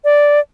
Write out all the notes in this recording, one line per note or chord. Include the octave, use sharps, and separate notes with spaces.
D5